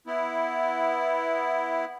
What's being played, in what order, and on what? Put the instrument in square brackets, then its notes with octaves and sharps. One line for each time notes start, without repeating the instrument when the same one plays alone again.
[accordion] B3 E4